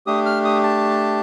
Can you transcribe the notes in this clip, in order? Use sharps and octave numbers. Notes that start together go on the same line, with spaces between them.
A3 D4 G4 D#6
F6
D#6
A5